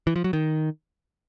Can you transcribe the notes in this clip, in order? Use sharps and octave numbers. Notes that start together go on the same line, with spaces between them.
E3
F3
F#3
D#3